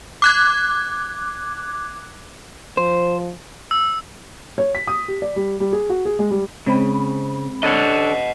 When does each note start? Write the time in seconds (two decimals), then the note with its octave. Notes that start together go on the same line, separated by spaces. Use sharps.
0.22 D6 F#6 G#6
2.77 F3 C5
3.71 E6
4.58 C#5
4.75 B6
4.87 D#6
5.08 G4
5.22 D5
5.36 G3
5.60 G3
5.73 G#4
5.89 F#4
6.05 G#4
6.19 G#3
6.31 G3
6.66 C#3 G#3 C4 B5
7.63 D4 A4 C#5 D#5 F#5